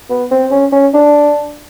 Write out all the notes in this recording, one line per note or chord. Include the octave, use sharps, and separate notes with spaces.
B3
C4
C#4
C#4
D4